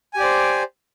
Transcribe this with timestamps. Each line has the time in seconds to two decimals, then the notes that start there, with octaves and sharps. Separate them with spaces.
0.14 G#5
0.17 G4
0.20 D5
0.23 C5